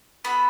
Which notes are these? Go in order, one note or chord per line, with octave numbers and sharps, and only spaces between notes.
B3 F#4 A4 B5